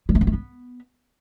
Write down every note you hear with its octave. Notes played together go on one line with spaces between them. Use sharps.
G3
A3
B3
A3
B3